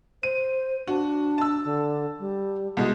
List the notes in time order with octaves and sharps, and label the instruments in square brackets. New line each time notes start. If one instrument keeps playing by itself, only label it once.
[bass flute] C5 [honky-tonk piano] D#7
[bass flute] D4 [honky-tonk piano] F#4
[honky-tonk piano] A5 E6
[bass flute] D3
G3
[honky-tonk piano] C2 B2 G#3